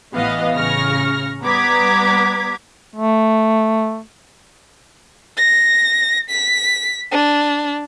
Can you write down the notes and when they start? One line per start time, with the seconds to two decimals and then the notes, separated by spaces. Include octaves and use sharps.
0.14 A1 E3 B3 D#5 F5
0.56 A1 C#3 C#6 F6 A#6
1.42 G3 B3 A#5 D6 G#6 B6
2.95 A3
5.37 A#6
6.30 B6
7.12 D4